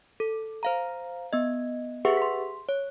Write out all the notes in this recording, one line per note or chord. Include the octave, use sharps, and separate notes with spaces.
A4
C5 F5 A#5
B3 D#5
G4 G#4 B4 E5 F#5 C#6
C6 B6
C#5